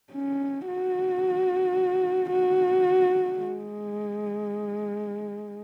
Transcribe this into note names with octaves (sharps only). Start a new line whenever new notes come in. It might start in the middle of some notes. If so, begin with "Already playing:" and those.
C#4
F#4
F#4
G#3